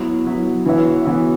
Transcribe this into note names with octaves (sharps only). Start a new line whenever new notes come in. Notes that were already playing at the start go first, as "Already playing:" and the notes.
Already playing: F#3 B3 E4 B4
F#3 B3 E4 B4
E3 B3 F#4 C#5 E5
E3 B3 F#4 C#5 E5